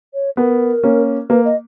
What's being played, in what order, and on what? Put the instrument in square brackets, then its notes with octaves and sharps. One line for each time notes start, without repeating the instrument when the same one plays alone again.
[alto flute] C#5
[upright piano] B3 [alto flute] A#4
[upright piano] A#3 C#4
[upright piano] A#3 [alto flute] B4
[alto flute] D#5